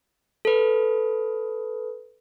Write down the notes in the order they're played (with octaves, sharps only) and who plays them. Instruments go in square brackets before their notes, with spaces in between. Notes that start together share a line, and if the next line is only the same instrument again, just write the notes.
[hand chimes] A4 B4